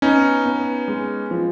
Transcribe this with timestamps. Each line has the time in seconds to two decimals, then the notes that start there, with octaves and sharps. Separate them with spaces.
0.02 B3 C#4 D#4
0.46 B3
0.88 G#3
1.31 F3